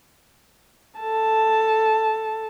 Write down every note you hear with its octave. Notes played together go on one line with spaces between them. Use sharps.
A4 A5